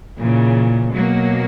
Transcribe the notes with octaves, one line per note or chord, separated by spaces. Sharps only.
A#2 C#3 E3
B2 F#3 A#3